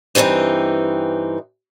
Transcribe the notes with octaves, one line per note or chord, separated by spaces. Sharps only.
G2 E3 C4 C#4 D#4